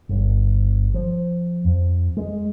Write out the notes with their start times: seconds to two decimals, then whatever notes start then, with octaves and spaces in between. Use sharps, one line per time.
0.09 G1
0.94 F3
1.65 F2
2.17 G#3